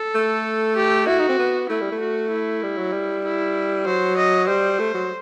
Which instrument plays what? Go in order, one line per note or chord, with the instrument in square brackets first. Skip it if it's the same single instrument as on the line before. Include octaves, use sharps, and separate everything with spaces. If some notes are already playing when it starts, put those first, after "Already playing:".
Already playing: [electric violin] A4
[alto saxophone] A3
[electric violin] G4
[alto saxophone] E4 [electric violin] F#4
[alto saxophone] D#4
C4
B3
[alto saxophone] A3 [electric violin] E4
[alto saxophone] G3
A3
[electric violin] F#4
E4
[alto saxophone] G3
F#3
G3
[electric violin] E4
[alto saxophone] F#3 [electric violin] C5
[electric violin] D#5
[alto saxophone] G3 [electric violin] C5
[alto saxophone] A3
F#3